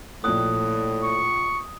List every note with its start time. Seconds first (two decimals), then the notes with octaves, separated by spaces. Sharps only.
0.24 A#1 A2 D#6 F#6
1.03 C#6